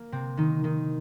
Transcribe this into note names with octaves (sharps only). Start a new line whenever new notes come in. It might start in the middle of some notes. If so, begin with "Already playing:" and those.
Already playing: A#3
C3 C4
D#3 D#4
D#3 D#4